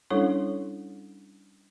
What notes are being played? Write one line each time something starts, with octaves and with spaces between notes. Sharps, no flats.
G3 C#4 D4 E4 A4 C#5